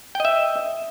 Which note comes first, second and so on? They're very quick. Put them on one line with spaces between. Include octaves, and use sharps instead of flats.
G5 D#5 E5